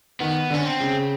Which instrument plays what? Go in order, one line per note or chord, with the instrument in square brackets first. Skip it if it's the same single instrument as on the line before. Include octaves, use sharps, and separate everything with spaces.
[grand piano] D#3 [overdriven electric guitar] B3
[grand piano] D3 [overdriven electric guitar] C#4
[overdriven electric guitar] C4
[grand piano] C#3